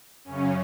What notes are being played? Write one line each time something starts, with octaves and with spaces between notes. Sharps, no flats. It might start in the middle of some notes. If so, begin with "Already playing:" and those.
F#2 C#3 C#4